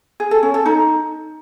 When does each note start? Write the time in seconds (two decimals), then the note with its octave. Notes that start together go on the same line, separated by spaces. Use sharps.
0.20 G#4
0.31 A4
0.43 C#4
0.54 A4
0.66 D#4